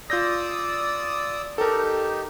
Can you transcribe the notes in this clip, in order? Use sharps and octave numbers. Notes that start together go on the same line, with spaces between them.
F4 D5 D#6 E6 G6 A#6
D#4 G4 A4 A#4